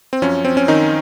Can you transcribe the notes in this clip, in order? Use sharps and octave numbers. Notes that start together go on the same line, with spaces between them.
C4
F#2 F3 C#4
C4
C#4
D#3 D#4